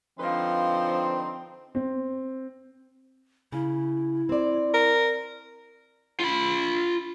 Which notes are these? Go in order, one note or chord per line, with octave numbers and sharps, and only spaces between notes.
D3 F3 C4 D#4 B4 F5 C6
C4
C#3 E4
C4 D5
A#4
F4 B5